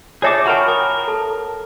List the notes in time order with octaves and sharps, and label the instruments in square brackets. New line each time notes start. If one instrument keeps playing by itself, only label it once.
[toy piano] F4 C#5 E5 [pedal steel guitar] G#4 A4 D6
[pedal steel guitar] F#4 A#4 G5 [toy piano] F#5 B5
[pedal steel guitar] A#4 [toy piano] G5 D#6
[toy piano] A4 A5